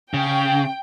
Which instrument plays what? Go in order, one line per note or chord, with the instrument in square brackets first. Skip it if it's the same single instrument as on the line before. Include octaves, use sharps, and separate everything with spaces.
[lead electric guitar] C#3 [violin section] G5